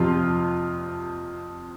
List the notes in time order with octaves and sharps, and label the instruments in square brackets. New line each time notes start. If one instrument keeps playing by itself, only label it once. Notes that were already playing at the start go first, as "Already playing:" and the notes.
Already playing: [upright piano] F2 C3 F3 F4